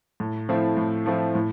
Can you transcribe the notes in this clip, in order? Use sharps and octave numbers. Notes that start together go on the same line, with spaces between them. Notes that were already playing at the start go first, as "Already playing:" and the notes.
A2
F3 A3 C4 E4
A2
F3 A3 C4 E4
A2